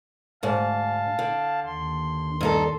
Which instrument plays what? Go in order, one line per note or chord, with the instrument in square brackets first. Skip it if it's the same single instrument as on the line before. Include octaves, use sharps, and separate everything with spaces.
[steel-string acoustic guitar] D2 G#2 [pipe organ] F5 A5
[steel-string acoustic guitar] D3
[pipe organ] D#2 C6
[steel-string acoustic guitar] G2 D#4 A4